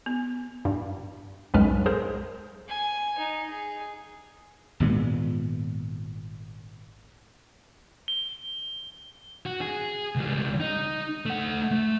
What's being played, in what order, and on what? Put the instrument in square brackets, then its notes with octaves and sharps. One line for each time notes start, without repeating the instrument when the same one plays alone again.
[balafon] B3
[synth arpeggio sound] G2
B1 F#2 A2 G#3 B4 F6
G#4 A#4 C5
[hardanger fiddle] G#5
D#4
G#4
[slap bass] G#1 A#2 G#3 B3
[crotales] G7
[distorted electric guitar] F#4
G#4
C#2 G3
D#4
A3 F#5
A3